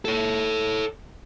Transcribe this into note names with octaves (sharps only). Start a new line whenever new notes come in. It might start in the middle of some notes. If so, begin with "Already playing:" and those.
A4 C#5